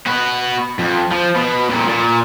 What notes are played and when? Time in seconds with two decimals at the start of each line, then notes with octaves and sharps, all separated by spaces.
0.06 B3 F#4
0.79 F2
1.12 F3
1.35 B2
1.69 F2 A#2
1.88 A#2